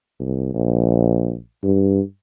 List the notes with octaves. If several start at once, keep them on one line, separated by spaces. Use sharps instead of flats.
C2
A#1
G2